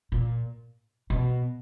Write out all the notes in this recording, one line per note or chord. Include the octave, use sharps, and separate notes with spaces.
A#2
B2